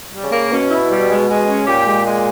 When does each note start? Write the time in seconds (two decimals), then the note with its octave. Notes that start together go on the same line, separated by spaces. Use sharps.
0.13 G3
0.23 C#3
0.32 A#3
0.52 B2 C#4
0.71 E4
0.91 G3
1.10 G#3
1.28 G#3
1.48 C#4
1.67 A#2 G4
1.86 G#3
2.06 G#3